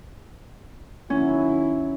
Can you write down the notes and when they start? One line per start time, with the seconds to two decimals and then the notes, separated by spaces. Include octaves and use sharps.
1.10 D#3 F#3 C#4 E4